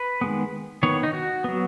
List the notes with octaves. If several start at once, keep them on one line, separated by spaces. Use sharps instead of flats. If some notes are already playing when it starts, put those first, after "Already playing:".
Already playing: B4
D#3 G#3 B3
D#3 B3 C#5
D#4
F#4
F#3 B3